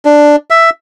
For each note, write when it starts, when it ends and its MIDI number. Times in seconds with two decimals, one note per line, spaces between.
0.05 0.36 62
0.50 0.70 76